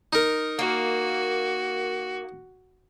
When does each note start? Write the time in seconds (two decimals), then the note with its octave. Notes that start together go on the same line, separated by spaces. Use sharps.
0.13 D#4 A#4
0.59 A#3 F#4